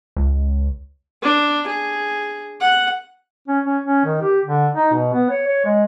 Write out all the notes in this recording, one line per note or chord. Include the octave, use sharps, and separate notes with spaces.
C#2
D4
G#4
F#5
C#4
C#4
C#4
D#3
G4
D3
D#4
B2
B3
C#5
C#5
G#3